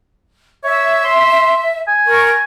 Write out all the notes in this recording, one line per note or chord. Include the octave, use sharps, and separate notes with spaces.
C#5 E5
C6
G#5
A#4 C#6